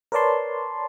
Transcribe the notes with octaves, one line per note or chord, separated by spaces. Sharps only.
A#4 B4 C#5 D5 A5 C6